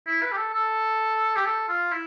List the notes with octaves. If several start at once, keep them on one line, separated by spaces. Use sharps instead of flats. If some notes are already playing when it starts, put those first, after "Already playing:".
E4
B4
G4
A4
A4
G4
A4
F4
E4